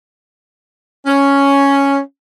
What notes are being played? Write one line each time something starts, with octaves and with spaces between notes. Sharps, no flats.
C#4